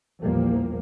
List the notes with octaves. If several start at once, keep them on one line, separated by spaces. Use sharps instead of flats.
A#1 E2 A#2 F3 G3 A#3